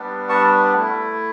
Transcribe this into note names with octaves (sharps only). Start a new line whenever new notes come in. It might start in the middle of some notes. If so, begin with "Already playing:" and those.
Already playing: G3 B3 D4
A5 C#6
A3 E4